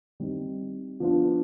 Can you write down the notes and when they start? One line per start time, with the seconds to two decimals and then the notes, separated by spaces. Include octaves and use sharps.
0.20 G3 C4 D#4
1.00 F3 B3 D4 F4